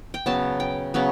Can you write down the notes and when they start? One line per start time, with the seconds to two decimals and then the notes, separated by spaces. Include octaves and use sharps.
0.14 G5
0.26 C#3 F#3 B3 A5
0.60 G5
0.94 C#3 F#3 B3